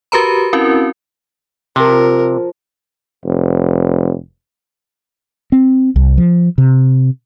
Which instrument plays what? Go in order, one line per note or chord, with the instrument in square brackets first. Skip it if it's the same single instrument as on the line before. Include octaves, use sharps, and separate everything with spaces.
[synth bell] F#4 G4 A#4 B4 A#5 B5
C4 C#4 E4 F#4 A#4
[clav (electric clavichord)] C3 [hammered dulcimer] F3 [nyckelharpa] A#4
[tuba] F1
[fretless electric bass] C4
C2
F3
C3